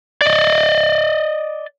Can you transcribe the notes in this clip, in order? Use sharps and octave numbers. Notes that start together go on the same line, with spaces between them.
D5 D#5